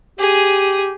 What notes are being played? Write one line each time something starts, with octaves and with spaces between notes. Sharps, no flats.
G4 G#4 D#6